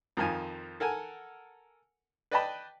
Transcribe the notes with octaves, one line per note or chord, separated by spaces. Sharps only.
F2 D#3 F3 G#5
A4 A#4 F#5 G#5
B4 D5 D#5 G5 A5 B5